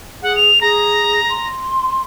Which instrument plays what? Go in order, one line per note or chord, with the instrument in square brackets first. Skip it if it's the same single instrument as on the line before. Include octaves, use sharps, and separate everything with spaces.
[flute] G#4 [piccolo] F#5
[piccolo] F7
[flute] G#4 [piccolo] A#5
[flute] C6